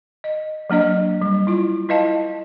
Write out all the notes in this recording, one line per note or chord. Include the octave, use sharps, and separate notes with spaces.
D#5
F#3 A#3 D4 D#5
G3
E4 F4
E4 B4 D#5 F5 A5